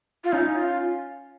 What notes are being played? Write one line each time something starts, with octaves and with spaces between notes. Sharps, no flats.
F4
C#4 D#4
F4